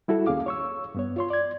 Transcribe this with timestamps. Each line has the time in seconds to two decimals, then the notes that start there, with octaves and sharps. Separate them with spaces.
0.08 G3 E4 F#4 A4
0.27 D#2 A#3 C#4 G#4 F5 D6
0.46 C#5 C#6 E6
0.94 G2 B3 C#5
1.16 F4 C#5 C6
1.30 D5 G#6